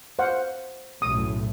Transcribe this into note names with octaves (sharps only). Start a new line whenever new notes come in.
C5 F5 F#5
B1 F#2 A2 D#6